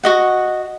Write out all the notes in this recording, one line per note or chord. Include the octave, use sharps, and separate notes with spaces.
F#4 D#5 F#5